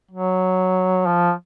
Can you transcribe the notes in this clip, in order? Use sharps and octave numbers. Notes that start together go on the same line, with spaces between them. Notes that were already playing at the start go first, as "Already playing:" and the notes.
F#3
F3